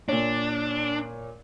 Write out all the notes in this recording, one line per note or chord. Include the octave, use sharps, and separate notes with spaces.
A#2 D4 C#5